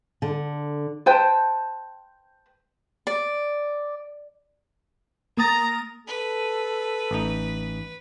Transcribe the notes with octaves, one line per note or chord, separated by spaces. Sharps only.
D3
B4 C5 G5 A5
D5
A#3 A#5 D#6 A6
A4 B4
A1 D#4